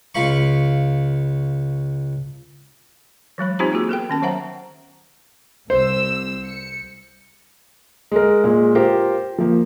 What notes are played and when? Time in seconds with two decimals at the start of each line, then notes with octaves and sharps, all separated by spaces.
0.15 C#2 F5 B5 C#6
3.38 E3 F#3 G#3 B5
3.59 C4 D#4 F4 G4 C5 A#5
3.72 A#3 F4 F#4 G#4
3.89 B3 A4 A#4 G5
4.10 D#3 C#4 A5
4.22 F#3 C5 E5 F#5 A#5
5.70 C2 C5 E6
6.44 C#7
8.12 G#3 A#4
8.44 A#2 G#3
8.75 F4 G4 A#4 C5
9.38 F3 A#3